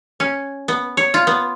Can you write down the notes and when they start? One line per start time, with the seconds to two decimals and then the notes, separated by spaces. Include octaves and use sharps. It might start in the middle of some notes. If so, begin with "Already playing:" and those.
0.20 C#4
0.68 B3
0.97 C#5
1.14 F4
1.27 B3